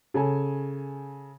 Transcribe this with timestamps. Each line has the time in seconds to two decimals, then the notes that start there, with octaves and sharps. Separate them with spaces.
0.14 C#3 A4 G#5